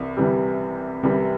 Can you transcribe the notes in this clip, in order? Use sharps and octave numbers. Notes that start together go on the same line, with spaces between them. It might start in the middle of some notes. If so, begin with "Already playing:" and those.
Already playing: C2 C3 E3
C2 C3 E3 G3
C2 C3 E3 G3